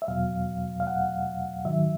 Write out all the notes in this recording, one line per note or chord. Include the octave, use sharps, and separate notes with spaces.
E5
E2 B2 F#3 F5
F5
F#5
G#2 D#3 F#3 E5